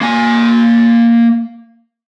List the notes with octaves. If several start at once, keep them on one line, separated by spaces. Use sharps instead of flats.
A#3 G#5